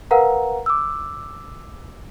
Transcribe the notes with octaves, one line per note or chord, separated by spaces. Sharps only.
A#4 B4 F5 F#5 A#5
D6 E6